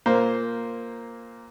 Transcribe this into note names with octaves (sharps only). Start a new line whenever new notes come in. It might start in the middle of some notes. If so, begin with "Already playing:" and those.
A#2 A#3 C5